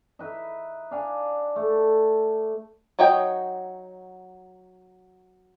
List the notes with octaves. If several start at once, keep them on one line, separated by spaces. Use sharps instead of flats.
D#4 B4 E5
D4 F5 G#5
A3
F#3 D#4 C#5 D#5 G5